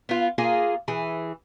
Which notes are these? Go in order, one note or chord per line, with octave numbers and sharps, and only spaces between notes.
B3 F4
A#3 F4 G#4
E3 G#4